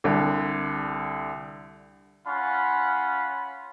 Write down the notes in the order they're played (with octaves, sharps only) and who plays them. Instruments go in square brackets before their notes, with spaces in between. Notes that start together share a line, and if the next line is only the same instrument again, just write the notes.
[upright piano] C2 D3
[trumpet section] C#4 F4 F#5 B5